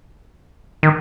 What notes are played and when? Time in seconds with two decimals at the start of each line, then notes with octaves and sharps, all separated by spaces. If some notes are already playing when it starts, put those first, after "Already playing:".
0.83 D#3